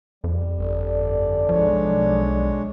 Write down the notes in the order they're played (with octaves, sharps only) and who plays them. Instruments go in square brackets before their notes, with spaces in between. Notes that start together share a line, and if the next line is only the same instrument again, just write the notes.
[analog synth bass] F2 [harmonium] G3
[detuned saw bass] G1 [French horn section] A4 D5
[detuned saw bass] B1 [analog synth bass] F3 [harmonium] G#3 D4 C#5